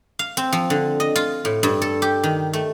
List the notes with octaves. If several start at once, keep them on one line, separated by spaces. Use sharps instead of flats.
F5
C4
F3
D3
D#5
F4
A2
G2
A4
G4
D#3
A3